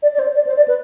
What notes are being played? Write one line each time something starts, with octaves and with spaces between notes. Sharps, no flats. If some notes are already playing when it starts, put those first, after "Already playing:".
D5
D5
C5
D5
C5
D5
B4